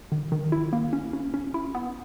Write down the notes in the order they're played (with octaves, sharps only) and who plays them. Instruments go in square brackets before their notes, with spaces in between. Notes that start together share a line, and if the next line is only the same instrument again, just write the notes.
[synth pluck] D#3
D#3
E4
A#3
C#4
C#4
C#4
E4
B3